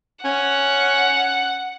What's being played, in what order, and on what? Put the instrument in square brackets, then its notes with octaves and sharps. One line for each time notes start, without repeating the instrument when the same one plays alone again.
[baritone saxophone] C#4 [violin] F#5